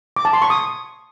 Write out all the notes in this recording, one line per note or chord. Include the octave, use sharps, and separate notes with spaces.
D6
A5
C6
C#6
D#6